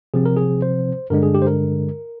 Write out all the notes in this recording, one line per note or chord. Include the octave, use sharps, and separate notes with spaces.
C3 F3 C4 G#4
A#4
G#4
C5
G2 D3 G#3 D4 A#4
G#4
G4
C5
A#4